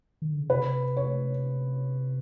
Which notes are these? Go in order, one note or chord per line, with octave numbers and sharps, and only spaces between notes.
D#3
D3
C#3
C3 B4
C#5